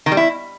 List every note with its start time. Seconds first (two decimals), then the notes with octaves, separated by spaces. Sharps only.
0.06 D#3
0.12 G3
0.17 E4